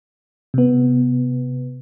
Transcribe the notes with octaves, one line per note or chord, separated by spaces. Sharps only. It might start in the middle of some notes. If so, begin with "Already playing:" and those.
C3 B3